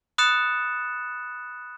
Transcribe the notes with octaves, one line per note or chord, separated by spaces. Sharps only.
B5 D#6 F#6 A6 C#7 E7